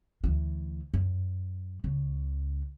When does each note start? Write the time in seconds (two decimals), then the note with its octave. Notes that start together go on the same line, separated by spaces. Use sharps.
0.24 D2 E3
0.94 F#2
1.84 C#2 C#3